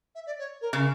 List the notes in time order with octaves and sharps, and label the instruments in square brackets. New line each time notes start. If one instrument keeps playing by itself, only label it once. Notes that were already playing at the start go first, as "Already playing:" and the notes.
[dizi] E5
D5
C#5
A#4
[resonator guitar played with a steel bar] C#3